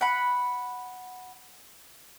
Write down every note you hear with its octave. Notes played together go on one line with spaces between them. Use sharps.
F#5 B5